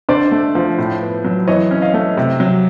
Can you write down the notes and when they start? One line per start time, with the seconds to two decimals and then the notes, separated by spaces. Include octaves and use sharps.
0.09 D3 C5 D5
0.32 A3
0.55 F3
0.78 A2
1.02 B3
1.24 F#3
1.48 E3 C#5 D#5
1.71 C#4
1.82 D#5 F5
1.94 A3
2.17 C3
2.40 F#3